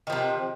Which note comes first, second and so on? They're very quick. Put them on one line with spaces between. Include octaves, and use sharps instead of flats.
D#3 F3 C3